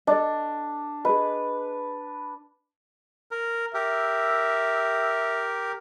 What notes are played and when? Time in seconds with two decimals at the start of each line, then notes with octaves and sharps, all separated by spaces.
0.07 D4 A4 D5 D#5
1.05 G#4 B4 D#5
3.31 A#4
3.74 G4 A#4 E5